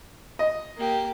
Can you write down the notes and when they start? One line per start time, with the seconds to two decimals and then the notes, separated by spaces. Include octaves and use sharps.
0.39 D#5
0.77 A#3 G4